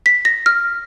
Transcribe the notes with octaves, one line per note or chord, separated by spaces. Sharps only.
B6
A#6
F6